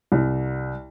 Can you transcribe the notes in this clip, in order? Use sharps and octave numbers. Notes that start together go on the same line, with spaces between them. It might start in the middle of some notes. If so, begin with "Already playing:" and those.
C2